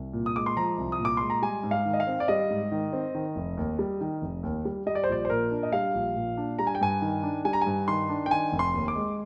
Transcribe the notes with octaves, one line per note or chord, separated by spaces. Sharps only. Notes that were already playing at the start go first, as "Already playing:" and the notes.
Already playing: C2
A#2
D#6
G#3 D6
C6
F3 A#5
C2
D#6
A#2
D6
G#3 C6
A#5
G3 G#5
G#2
F5
D#3
D#5
F5
C4
D5
G3 D#5
G#2
D#3
C4
D#3
F1
D#2
G3
D#3
F1
D#2
G3
G3 D#5
D5
C5
A#1 D5
C5
A#2 A#4
D4
D#5
G3 F5
A#1
A#2
D4
G3 A#5
G#5
G5
G2 G#5
D#3
D4
G3 G#5
A#5
G2 G#5
D#3 C6
D4
G5
D#3 G#5
F1
C6
D#2
D6
G#3